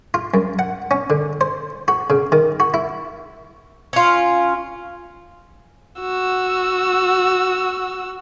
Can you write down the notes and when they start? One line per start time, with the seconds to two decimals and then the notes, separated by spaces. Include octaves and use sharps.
0.14 F4
0.34 F#2
0.59 F#5
0.91 C#4
1.10 D3
1.41 C5
1.88 F#4
2.10 C#3
2.32 D#3
2.60 F#4
2.74 E4
3.93 C#4 F4
6.00 F#4 E6